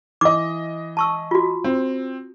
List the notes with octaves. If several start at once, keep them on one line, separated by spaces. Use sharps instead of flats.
E3 D#5 D6
A5 C#6 E6
F4 F#4
C4